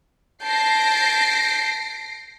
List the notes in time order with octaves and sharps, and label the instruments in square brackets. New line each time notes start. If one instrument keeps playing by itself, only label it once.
[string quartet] A5 G6 [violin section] A#6 C7 D7